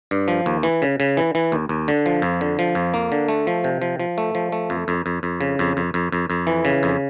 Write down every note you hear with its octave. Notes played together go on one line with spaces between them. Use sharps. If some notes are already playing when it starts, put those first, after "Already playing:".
G2
F3
D#2
E3
C#3
C#3
E3
E3
D#2
D#2
D3
F3
F2
D3
F3
F2
A#3
D3
A3
F3
C3
F3
F3
A3
F3
A3
F2
F2
F2
F2
C#3
F2
F2
F2
F2
F2
E3
C#3
F2